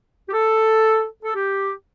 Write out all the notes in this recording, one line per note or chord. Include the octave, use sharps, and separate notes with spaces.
G4
A4
A4
G4